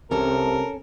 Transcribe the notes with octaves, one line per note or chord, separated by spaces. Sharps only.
C2 C3 C#4 A4 A#4